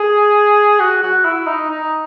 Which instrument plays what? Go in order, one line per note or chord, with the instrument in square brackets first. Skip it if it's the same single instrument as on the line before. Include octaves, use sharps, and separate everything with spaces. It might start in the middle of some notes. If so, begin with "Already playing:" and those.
Already playing: [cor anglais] G#4
F#4
F#4
E4
D#4
D#4